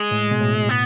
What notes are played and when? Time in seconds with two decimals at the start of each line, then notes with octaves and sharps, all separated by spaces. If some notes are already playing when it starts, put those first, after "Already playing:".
Already playing: G#3
0.11 A2
0.31 B2
0.41 A2
0.69 B3